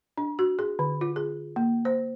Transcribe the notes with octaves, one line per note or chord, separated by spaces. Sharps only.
D4
F#4
G#4
D3
F4
G#4
A#3
C5